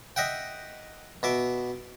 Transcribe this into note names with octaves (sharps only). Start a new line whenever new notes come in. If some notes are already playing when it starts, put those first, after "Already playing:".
D#5 E5 F#5 G5
B2 E5 D6